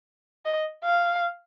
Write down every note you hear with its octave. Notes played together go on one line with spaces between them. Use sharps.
D#5
F5